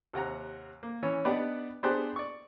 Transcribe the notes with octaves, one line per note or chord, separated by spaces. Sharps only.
D#2 C3 F#5 A#5
A#3
E3 C#4 C#5
B3 D4 D#4 G4 D5 F#5
B3 D4 G4 G#4 C5 F#6
D5 C#6